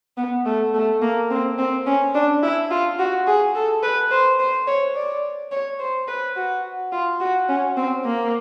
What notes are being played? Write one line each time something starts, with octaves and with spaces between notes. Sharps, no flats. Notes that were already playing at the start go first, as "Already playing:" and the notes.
B3
A3
A3
A#3
C4
C4
C#4
D4
E4
F4
F#4
G#4
A4
B4
C5
C5
C#5
D5
C#5
C5
B4
F#4
F4
F#4
C#4
C4
A#3